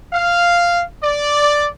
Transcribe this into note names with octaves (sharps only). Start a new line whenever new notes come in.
F5
D5